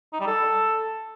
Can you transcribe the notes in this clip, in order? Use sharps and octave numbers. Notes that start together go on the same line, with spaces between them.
D#4
G3
A4